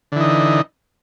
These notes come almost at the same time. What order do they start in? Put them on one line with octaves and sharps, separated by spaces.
D3 E3 D#4